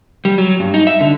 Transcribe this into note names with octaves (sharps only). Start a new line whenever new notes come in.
G3
F#3
G2
D#4
E5
D3